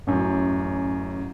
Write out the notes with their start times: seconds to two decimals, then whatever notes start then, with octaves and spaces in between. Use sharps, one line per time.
0.07 A1 F#2